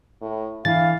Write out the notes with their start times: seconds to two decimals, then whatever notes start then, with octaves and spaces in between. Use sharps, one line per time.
0.21 A2
0.65 D3 E3 E4 F5 A6